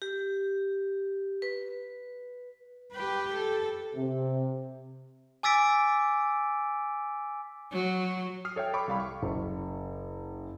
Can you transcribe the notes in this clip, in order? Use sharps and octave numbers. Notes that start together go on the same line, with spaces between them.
G4
B4
G4 B4
A4
C3
G#5 D6 E6 A6 B6 D7
F#3
D#6 F6 C7
A4 C#5 E5 G5
A4 G5 B5 C#6 D6
C2 G3 F5 B5
C#6
F#1